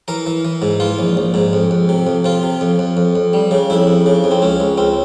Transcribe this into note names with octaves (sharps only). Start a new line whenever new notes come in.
E3 A#4
E3
E3
G#2
E3 F4
A#1
A#1
G#2
F2
F2
C3
F2
C3 F4
C3
F2
F2
F2
F2
G3
C#3
F2 E4
F2
C#3
F2
C4
C#2 C#4
C#2
C#2 C4